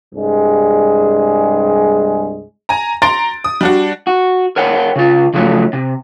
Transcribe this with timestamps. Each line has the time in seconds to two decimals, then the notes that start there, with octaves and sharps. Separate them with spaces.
0.14 C2 G2 G#3 G#4
2.69 G#5 A#5
3.02 A#5 C6 A6 D7
3.44 D#6
3.61 G3 D4 F#4
4.07 F#4
4.56 A#4 C#5 F#5 G5
4.96 C#3 F4
5.34 C#3 F3 F#3 A3 C#4
5.73 C3